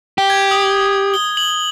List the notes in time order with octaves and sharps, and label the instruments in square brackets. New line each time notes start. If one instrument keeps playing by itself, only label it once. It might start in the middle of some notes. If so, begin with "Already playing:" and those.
[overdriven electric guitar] G4
[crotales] G#6
D#6
G7
F#7